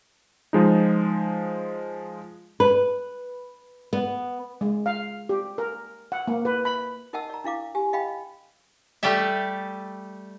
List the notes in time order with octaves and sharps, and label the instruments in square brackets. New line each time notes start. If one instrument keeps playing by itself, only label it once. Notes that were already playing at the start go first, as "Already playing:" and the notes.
[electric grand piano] F3 G#3 D#4
[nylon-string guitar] B4
B3
[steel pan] G#3
F5
G4
A#4
F#5
A#3
B4
B5
[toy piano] D#4 A#4 D#5 F#5 A5 E6
D5 A#5
D4 E4 F5 D6
G4 G#5
D#5 F5 G5 B5
[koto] G3 A3 G4 A4 E5